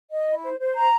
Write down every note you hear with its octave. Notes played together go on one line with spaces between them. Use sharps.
D#5
E4
C5
C5
A#5